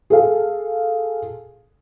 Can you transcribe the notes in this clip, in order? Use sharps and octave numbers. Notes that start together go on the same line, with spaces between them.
G#4 A4 F5